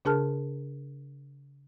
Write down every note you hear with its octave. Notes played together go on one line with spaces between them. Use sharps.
C#3 D4 G#4 A#4 A5 F6